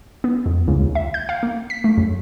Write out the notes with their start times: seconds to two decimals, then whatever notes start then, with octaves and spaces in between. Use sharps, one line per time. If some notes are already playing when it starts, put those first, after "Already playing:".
0.24 B3
0.46 F2
0.68 C#2
0.81 D#2
0.95 E5
1.14 G6
1.29 F5
1.43 A#3
1.70 B6
1.84 A3
1.98 F#2